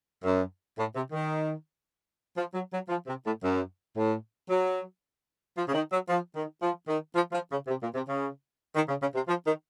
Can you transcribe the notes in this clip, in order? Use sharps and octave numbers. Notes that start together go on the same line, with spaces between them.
F#2
A2
C3
D#3
F3
F#3
F#3
F3
C3
A2
F#2
A2
F#3
F3
C#3
D#3
F#3
F3
D#3
F3
D#3
F3
F3
C#3
C3
A#2
C3
C#3
D#3
C#3
C#3
C3
F3
D#3